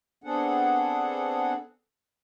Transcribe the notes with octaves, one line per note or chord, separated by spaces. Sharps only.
B3 C4 D4 G#4 A4 F#5